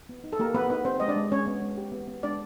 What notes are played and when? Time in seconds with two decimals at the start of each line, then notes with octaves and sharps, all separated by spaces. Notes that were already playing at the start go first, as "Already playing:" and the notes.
0.09 B3
0.24 D#4
0.33 A4
0.39 A#3 G4 A#4
0.55 B3 B4
0.70 B3 D#4 B4
0.85 C4 G4 C5
1.00 G#3 D#5
1.08 D4 D5
1.16 G#3
1.31 G#3 C#4 C#5
1.46 B3
1.62 G#3
1.77 G4
1.92 B3
2.08 B3
2.23 G#3 D4 D5